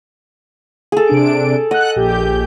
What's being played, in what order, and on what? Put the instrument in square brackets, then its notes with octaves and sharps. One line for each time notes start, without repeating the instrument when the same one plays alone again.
[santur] G#4 A4
[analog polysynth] C3 D4 D7
[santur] D#5 [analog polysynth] F#5 F#6
[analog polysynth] A#1 G4 G6